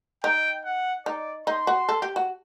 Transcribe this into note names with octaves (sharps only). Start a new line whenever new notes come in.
D#4 G5
F#5
D#4 D5
D#4 C6
F#4
A4
G4
F#4